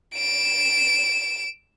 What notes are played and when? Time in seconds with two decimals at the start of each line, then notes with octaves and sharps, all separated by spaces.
0.15 D7 E7